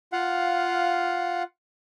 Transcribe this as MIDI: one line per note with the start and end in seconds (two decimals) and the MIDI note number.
0.13 1.43 65
0.13 1.43 77
0.13 1.43 78